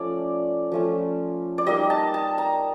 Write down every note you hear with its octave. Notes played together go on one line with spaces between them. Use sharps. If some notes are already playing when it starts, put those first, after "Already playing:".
Already playing: F3 A3 C#4 D5
F3 A3 C#4
D5
G3 A#3 D#4 D#5
A5
A5
A#5